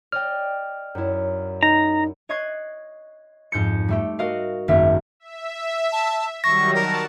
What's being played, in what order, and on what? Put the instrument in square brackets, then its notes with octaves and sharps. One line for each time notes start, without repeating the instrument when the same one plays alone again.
[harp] D5 D#5 G5 [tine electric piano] F6
[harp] F#2 E4
[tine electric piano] D#4 [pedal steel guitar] A#5
[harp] C#5 D#5 C#6 F#6 G#6 C7
F2 G#2 G6 C#7
G3 A3 G4
F#4 A#4 D#5 F5
G#1 F#2 A#3 E5
[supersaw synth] E5
[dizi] A5
[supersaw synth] D#3 F#3 G3 [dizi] C#6 [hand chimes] A#6
[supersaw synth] F#4 A5 [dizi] A#4